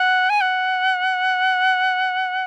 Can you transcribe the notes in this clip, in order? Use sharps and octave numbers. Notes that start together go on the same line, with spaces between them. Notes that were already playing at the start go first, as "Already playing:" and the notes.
Already playing: F#5
G#5
F#5